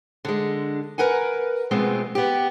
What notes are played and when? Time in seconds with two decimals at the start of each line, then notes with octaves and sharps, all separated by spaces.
0.25 D3 G#3
0.98 A#4 B4 F#5 G#5
1.71 B2 F3 G#3 A3 B3 C4
2.15 B3 G4